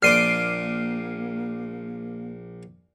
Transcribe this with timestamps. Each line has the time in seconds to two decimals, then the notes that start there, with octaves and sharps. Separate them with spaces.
0.03 A#1 A#3 D5 C6 D6 F6 C7 D#7